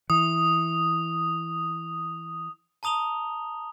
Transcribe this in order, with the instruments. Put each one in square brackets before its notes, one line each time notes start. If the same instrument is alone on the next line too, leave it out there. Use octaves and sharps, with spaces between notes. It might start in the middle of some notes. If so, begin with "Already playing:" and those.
[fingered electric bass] E3 [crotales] D#6
[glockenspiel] A5 A#5 D#6 F7 G7